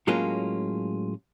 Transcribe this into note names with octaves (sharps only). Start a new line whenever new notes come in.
A2 F#3 G#3 A#3 C#4 F4